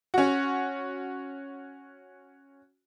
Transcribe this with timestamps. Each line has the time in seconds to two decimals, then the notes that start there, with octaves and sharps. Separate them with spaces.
0.14 C#4 F#4